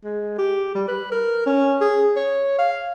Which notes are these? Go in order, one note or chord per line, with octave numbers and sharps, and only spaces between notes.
G#3
G4
G3
B4
A#4
C#4
G#4
C#5
F5